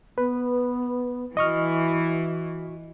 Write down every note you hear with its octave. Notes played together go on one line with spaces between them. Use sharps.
B3 B4
E3 F#4 D#5 C#6 F6